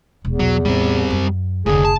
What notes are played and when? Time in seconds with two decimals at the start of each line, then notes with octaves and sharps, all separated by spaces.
0.25 E1 E2
0.39 B1 F#3
0.65 A1 G3 C4
1.10 F#2
1.66 F1 D2 A2 D3 G#4
1.85 A5